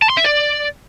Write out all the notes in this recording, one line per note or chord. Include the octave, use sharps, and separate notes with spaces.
A5
C6
E5
D5